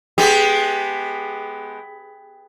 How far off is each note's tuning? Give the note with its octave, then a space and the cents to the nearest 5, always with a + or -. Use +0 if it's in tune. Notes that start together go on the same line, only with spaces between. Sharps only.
G#3 +25 B3 +10 G4 +15